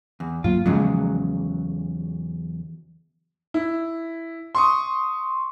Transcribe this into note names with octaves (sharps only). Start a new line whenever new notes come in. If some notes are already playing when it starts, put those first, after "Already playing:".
E2
G2 F#3 A#3 F4
E2 C#3 F3 F#3 G#3
E4
C6 C#6 D#6